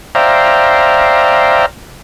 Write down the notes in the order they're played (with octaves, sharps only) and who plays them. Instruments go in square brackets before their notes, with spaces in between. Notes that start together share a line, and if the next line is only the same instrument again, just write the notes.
[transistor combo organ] C5 D5 E5 F5 G5 A#5